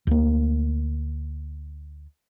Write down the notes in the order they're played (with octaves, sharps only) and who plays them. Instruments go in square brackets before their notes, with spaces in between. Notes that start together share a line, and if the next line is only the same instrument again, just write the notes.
[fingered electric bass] D2 A#3